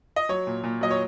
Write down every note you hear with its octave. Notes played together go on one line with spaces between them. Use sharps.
D#5
F#3 C#5
A#2
A#2
F#3 D#5
C#5